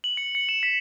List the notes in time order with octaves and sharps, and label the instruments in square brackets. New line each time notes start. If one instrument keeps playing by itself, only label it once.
[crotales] F#7
C#7
C#7
E7
B6